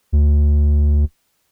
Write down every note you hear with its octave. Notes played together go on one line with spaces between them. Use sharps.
D2